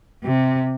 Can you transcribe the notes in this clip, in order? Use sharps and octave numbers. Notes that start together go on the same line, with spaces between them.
C3